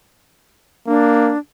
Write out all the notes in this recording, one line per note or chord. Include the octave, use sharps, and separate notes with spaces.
A#3 D4